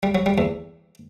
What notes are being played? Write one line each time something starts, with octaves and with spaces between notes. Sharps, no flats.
G3
F#3
G3
E2